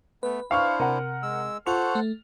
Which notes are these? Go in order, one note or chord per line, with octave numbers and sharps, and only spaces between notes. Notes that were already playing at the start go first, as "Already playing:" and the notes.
A3 B3 B4
D4 E4 C5 F5 C#6 F6
C3 A#4 F#5
G#3 E6
F4 A4 C5 F#5 C#6 F7
A3